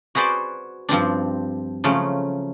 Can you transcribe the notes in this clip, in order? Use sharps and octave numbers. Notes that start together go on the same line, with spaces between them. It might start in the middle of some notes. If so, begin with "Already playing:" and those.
F#4 G#4 B4 C5 D5
G2 F3 C4 D4
C#3 F3 F#3 A3